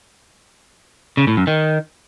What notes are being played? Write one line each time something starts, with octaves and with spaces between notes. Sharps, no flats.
C#3
A2
F#2
D#3